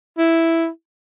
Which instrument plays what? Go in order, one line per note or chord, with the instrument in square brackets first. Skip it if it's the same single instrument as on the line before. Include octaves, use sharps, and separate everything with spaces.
[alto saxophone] E4